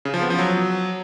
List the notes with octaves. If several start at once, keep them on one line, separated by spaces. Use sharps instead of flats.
C#3
F3
B3
F3
F#3